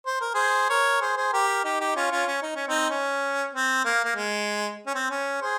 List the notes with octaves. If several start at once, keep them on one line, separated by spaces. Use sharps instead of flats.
C5
A#4
G#4 C5
A#4 C#5
G#4 C5
G#4 C5
G4 A#4
D#4 G4
D#4 G4
C#4 F4
C#4 F4
C#4
D#4
C#4
C4 D#4
C#4
C4
A#3
A#3
G#3
C#4
C4
C#4
G#4 C5